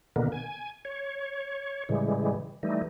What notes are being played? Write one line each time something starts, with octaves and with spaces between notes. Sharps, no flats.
B2 D3 D#3 A#3 B3
G#5
C#5
A2 C#3 E3 G3 G#3
E3 G3 A3 D#4